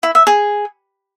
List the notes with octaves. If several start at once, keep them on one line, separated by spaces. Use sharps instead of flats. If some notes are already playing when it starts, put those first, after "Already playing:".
E4
E5
G#4